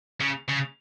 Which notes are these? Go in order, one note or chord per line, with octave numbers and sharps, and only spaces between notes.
C#3
C#3